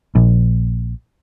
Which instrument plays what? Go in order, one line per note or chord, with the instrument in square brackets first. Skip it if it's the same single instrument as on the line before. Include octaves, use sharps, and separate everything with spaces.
[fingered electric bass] A#1